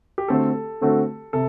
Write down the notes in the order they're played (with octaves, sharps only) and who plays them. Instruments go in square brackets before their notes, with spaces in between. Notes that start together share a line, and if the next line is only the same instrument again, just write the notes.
[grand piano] G4
[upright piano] D3 A3 C4 F#4 [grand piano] A4
[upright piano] D3 A3 C4 F#4
[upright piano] C3 [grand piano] A4